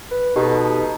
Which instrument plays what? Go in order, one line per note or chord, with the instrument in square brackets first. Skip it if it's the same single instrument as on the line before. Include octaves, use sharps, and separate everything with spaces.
[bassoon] B4
[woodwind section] B2 [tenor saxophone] D#4 [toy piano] G4 [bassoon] A4